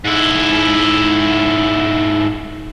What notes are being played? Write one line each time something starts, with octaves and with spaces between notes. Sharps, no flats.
G#2 E4